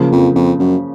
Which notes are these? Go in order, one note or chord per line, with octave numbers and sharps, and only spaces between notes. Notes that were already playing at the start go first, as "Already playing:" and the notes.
Already playing: C#3 F3 A#3
F2
F2
F#2